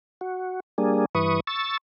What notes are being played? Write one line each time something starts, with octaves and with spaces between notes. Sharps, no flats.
F#4
G3 A#3 D4 G#4
G2 E3 B4 C#6 D#6
C#6 E6 A6